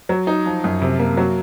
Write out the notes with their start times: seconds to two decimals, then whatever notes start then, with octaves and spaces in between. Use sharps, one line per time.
0.09 F#3
0.27 D#4
0.46 F3
0.64 F#2
0.82 C3
0.99 A#3
1.17 F#3